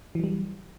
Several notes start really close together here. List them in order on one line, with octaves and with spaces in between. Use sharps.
E3 F#3 G3